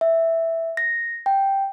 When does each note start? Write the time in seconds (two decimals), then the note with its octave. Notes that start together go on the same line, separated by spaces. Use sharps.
0.01 E5
0.77 A#6
1.26 G5